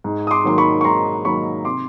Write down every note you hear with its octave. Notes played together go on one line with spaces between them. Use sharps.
G#2
D#6
C6 D6
D#3 F#3 A#3 C6
B5 C#6
C#6
G#2 A#5 C6
D#3 F#3 A#3 B5 C#6
C3 C6 D6